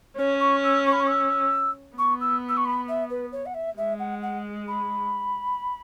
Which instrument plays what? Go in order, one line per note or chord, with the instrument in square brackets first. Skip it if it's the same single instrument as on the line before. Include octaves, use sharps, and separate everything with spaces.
[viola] C#4 [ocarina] C#5
[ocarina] C#6
E6
C#6
B5
C#6
E6
[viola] B3 [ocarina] C#6
[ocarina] E6
E6
C#6
B5
E5
B4
C#5
F#5
E5
[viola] G#3 [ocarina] E5
[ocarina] F#5
F#5
B5